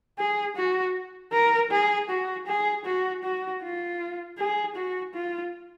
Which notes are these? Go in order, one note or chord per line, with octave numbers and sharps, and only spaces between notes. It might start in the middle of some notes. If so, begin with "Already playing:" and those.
G#4
F#4
A#4
G#4
F#4
G#4
F#4
F#4
F4
G#4
F#4
F4